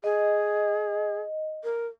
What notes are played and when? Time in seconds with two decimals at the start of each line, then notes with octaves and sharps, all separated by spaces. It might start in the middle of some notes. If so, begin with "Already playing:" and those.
0.04 G#4 D#5
1.64 A#4